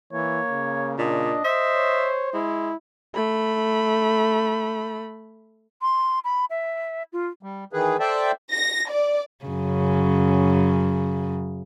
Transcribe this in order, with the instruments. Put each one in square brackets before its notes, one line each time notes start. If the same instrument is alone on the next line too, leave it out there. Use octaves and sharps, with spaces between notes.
[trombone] E3 [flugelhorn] A#3 [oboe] C#5
[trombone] C#3
[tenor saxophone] A#2 [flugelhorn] D4 [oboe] D#5
[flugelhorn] C5 [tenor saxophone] E5
[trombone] C#5
[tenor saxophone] G#3 [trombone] E4
[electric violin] A3 B5
[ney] C6
B5
E5
F4
[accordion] G3
D#3 E3 G#4 B4
A4 C5 D5 E5 G5 A5
[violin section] A#6
D5
[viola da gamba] F#2 C#3